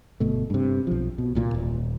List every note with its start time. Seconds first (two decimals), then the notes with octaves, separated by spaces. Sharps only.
0.20 G1 B2 A3
0.50 G2 C3
0.87 B1 F3
1.18 B2
1.35 C2 A#2 F3 A#3
1.54 D#1